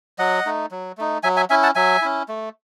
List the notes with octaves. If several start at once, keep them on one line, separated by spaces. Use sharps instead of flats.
F#3 D#5 F#5
A3 D#4
F#3
A3 D#4
F#3 E5 G#5
E5 G#5
C#4 E4 E5 G#5
F#5 A5
F#3 E5 G#5
C#4 E4
A3